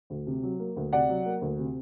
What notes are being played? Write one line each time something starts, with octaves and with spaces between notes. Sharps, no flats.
D2
C3
F#3
A#3
D2
C3 D5 F#5
F#3
A#3
D2
C3